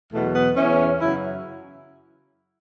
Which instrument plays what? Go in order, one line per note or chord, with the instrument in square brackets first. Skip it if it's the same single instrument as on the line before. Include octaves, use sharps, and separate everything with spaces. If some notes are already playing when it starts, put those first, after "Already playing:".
[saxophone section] E2 B2 F#3 A3
B3
E2 E3 C#4
F#2 C#3 F#3 E4